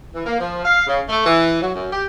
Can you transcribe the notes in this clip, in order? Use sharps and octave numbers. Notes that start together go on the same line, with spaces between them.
E3
A#3
F3
F5
C#3
A3
E3
F#3
F#2
G4